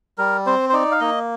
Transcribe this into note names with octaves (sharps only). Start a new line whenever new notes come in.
G3 A#4
C4 C5
C5
D#4 D5
F5
A#3 D#5